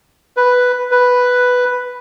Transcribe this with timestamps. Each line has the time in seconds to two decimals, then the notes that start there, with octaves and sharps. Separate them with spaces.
0.37 B4
0.91 B4